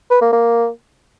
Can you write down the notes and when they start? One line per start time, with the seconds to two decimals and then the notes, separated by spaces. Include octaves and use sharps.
0.10 B4
0.21 A#3
0.33 A#3